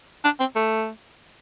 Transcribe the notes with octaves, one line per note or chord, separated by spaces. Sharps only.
D4
C4
A3